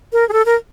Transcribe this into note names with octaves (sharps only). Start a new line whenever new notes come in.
A#4
G#4
A4
A#4